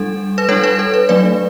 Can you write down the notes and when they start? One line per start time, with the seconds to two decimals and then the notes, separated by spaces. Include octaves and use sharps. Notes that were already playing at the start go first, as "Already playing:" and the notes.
Already playing: G3 D4 A4
0.38 B4
0.49 G3 D4 A4 C#5
0.63 B4
0.79 A4
0.94 B4
1.09 F#3 A3 D4 B4 D5